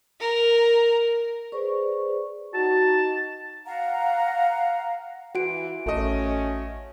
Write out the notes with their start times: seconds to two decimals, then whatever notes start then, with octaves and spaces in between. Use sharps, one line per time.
0.20 A#4
1.52 G#4 B4 C5 D5 C#6
2.54 D#4 F#4 A5
3.66 F5 F#5 A#5
5.35 E3 F#4 F#5 D7
5.86 A1 A3 C#4 D#5